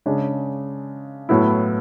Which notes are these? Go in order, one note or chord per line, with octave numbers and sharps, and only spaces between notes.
C#3 G#3 D4
A2 F#3 B3 E4